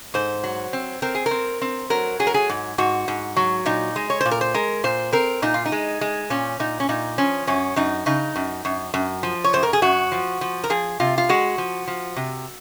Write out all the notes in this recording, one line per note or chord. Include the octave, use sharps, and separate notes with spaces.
G#2 C5
F#3
C4
C4 A#4
G#4
A#4
C4
C4
F#3 A#4
F#3 G#4
A#4
G#4
G#2
G#2 F#4
G#2
F#3
A#2 D#4
G#3
C#5
A#2 C5
A#4
C5
G#3 A#4
A#2 C5
C4 A#4
A#2 D#4
F4
D#4
G#3
G#3
A#2 C#4
A#2 D#4
C#4
A#2 D#4
F3 C#4
F#2 C#4
F#2 D#4
C#3 D#4
F#2
F#2
F#2
F3
C#5
F#2 C5
A#4
G#4
F#2 F#4
F3
F3
A#4
F3 G#4
C3 F4
F4
G#3 F#4
F3
F3
C3